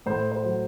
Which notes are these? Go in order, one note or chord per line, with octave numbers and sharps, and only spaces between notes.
A2 C5
C5
F#3